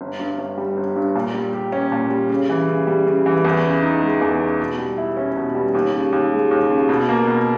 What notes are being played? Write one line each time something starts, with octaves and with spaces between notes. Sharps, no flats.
G1
G2
G1
G3
G1
G2
A#2
G3
G4
C#4
A#2
G3
C#3
E3
C#3
G3
C#3
E3
E2
C#3
D#4
G#3
E2
C#3
B2
G3
E4
C#4
B2
G3
D#2
C#3
D#2
G#3
D#2
C#3
B2
A#3
B2